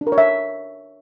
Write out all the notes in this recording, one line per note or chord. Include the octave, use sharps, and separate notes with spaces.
D4
A#4
C#5
E5